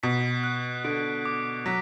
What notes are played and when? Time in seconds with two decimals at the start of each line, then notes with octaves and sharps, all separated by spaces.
0.03 B2 B6
0.44 F#6
0.84 D3 D7
1.25 D6
1.66 F#3 B6